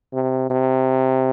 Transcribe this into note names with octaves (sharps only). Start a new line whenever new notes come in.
C3
C3